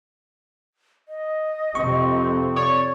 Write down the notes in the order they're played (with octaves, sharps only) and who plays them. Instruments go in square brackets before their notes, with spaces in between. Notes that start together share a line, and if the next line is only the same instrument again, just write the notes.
[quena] D#5
[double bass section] F2 C3 C4 [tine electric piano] C#6
[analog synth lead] C#5 [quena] D5